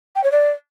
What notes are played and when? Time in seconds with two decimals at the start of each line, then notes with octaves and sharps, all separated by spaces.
0.15 G5
0.23 C#5
0.31 D5